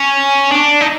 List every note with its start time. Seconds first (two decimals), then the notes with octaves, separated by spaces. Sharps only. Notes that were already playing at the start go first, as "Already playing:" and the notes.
Already playing: C#4
0.51 D4
0.81 D#4